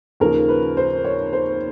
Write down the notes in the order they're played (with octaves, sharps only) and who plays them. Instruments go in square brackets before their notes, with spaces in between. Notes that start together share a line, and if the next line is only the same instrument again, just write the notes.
[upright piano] D#2 C#3 F3 A#4
B4
C5
C#5
C5